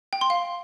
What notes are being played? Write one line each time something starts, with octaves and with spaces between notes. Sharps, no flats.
G5
C6
F5